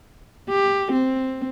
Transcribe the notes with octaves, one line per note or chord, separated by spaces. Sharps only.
G4
C4